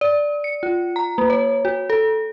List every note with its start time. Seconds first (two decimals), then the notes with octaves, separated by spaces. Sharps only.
0.01 D5
0.44 C#7
0.63 F4
0.96 A#5
1.18 A#3
1.30 C#5
1.65 F#4
1.90 A4